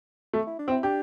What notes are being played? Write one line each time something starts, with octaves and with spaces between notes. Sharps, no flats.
A3
E4
D4
C4
E4
D4 G4